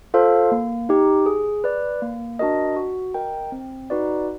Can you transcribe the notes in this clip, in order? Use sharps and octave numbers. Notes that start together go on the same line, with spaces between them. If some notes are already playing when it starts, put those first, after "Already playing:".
F4 A4 C5 F5
A#3
D#4 G4
G#4
B4 D5
A#3
D4 F#4 A#4 D#5
F#4
A#4 D#5 G5
C4
D#4 F#4 B4 D5